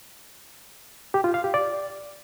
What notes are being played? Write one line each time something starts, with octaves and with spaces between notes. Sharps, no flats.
G4
F4
F5
G4
D5